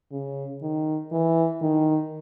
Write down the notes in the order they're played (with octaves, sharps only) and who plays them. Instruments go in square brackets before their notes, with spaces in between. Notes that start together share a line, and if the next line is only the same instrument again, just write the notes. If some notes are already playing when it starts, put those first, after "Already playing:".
[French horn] C#3
D#3
E3
D#3